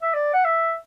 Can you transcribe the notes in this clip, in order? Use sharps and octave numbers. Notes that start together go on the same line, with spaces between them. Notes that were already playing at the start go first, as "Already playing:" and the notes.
E5
D5
F#5
E5